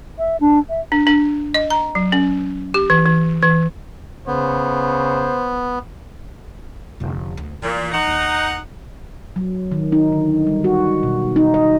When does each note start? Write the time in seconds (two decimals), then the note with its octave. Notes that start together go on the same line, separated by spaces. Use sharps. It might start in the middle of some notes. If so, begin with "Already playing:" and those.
0.19 E5
0.40 D4
0.70 E5
0.92 D4
1.07 D4
1.54 D#5
1.70 A#5
1.95 F#3
2.12 C#4
2.74 G4
2.90 E3
3.06 E3
3.42 E3
4.27 C#3 B3 C5
7.00 F1 D3
7.37 D2
7.62 A#2 E3
7.92 D#4 F#5
8.07 D#2
9.36 F#3
9.72 D#3
9.92 D#4
10.12 D3
10.47 G3
10.64 F#4
11.03 B2
11.36 D#4
11.54 D#5